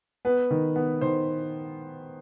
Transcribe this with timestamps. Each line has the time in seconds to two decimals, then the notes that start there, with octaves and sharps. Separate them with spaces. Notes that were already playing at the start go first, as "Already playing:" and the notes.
0.25 B3 B4
0.51 D#3
0.76 B3
1.01 D#3 C5